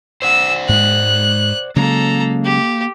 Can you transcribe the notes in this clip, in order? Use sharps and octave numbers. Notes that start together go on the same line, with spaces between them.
C5 D5 F#5 E6
G#2 G#3 F#6
C#3 F#3 G#3 A#3 A4 A#5
G4